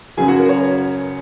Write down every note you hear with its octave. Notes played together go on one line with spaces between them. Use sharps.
F#2 C#3 F#3 G#4 G#5
F#4 F#5
A#4
C#5